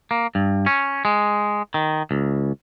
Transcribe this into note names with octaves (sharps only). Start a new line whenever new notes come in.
A#3
G2
C#4
G#3
D#3
C#2